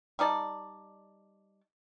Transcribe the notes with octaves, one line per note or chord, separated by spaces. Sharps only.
G3 D#4 D5 A5